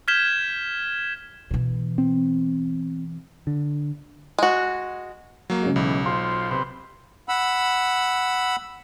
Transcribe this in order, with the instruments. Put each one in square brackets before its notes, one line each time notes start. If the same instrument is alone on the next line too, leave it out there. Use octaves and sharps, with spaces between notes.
[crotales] F6 G6 G#6 B6 E7 G7
[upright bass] B2 E3
[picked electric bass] C4
D3
[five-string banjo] G#3 F#4
[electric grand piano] F#3 A#3
[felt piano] C#3 G#3
[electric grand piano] B1 [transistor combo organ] E3
[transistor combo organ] F4 C5 [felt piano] C6
[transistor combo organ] C3 B4 C5
[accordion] F#5 B5 E6